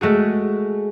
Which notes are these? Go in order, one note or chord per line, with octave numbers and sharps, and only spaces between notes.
G#3 A3 F#4 G#4